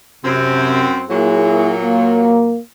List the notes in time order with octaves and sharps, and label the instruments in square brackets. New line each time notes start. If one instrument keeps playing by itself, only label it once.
[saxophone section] F#2 C4 [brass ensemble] C3
[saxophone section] A#2 F#3 [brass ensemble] A#3 E4 G#4
[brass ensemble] A#3